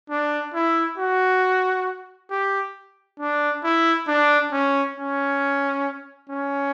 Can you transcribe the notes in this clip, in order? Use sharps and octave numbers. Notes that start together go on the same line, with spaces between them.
D4
E4
F#4
G4
D4
E4
D4
C#4
C#4
C#4